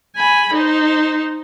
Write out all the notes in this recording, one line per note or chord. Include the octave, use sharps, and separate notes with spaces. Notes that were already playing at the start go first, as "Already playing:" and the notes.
G#5 B5
D#4 C5